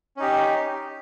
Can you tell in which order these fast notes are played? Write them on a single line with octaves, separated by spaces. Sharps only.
C#4 D#4 G4